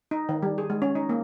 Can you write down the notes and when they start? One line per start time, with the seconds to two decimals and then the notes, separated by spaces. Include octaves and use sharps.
0.11 D#4
0.29 D#3
0.43 G3
0.58 G#4
0.70 G#3
0.82 C#4
0.95 D#4
1.09 A#3